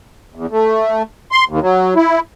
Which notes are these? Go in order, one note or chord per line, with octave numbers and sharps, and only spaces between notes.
E2
A3
C6
D#2
F#3
E4